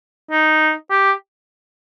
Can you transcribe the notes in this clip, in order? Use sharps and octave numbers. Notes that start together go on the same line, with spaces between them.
D#4
G4